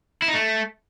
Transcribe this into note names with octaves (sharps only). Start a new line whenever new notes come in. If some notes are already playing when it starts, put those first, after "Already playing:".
E4
D#4
A3